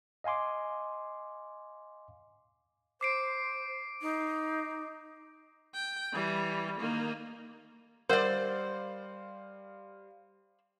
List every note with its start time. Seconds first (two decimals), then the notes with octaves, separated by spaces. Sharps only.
0.24 D#5 F5 G#5 C6 D6
3.01 C5 D6 C7 D7
4.02 D#4
5.74 G5
6.13 E3 G3
6.80 D#3 A#3
8.09 G3 A#4 C5 D5 F5 F#5 C6 F6